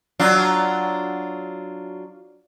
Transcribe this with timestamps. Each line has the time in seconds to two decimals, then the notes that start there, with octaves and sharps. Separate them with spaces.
0.19 F#3 D4 F4